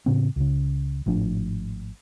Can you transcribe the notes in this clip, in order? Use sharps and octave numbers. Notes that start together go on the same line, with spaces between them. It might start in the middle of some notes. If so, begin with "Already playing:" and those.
A2 C#3 C4
C#2 C#3
G#1 A2 F3 D4